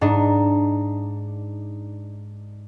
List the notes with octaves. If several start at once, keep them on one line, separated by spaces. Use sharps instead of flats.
G#2 D4 D#4